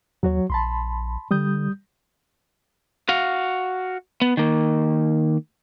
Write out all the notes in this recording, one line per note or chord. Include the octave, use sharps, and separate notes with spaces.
D#2 F#3 F#4 C#5
A#1 A5 B5 C6
D3 G3 D#6 G6
F#4 F5
B3
D#3 A#3